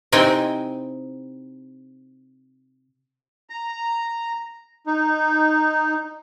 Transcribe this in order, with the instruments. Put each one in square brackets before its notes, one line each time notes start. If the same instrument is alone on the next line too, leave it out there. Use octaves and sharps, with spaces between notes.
[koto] C3 C4 D#4 E4 G5 G#5
[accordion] A#5
D#4